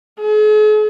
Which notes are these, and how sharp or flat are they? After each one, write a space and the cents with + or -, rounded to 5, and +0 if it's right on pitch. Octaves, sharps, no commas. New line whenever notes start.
G#4 +45